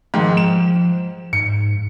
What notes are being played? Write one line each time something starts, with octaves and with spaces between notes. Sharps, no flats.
G#2 D#3 F3
E7
G#2 C#7